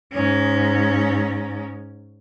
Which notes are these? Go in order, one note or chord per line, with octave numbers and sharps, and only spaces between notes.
G#2 C#4